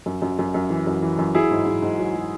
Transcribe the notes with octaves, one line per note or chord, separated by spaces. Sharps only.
F#2
F#2
F#2
F#2
E3
F#2
E3
F#2
F#3 E4 G#4
G#2
G#2
G#2
F#3
F#3